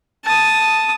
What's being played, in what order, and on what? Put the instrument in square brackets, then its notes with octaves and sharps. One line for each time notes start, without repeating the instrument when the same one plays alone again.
[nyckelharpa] A5 D#6